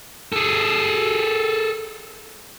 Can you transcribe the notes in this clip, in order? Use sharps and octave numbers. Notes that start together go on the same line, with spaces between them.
G#4 A4